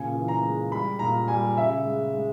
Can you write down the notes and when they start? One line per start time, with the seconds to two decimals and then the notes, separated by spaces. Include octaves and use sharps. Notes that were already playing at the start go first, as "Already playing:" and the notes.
Already playing: A#2 C#3 G#5
0.15 E3
0.28 A#5
0.43 G#3
0.72 G3 B5
0.99 A#2 A#5
1.28 G3 G#5
1.57 C#3 E5
1.85 G#3
2.13 G#3